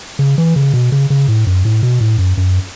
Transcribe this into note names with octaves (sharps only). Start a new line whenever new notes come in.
C#3
E3
C#3
B2
C#3
C#3
A2
F#2
A2
B2
A2
F#2
F#2